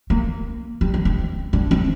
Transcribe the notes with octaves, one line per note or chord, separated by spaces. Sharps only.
A#3
G3
D4
C4
D4
C4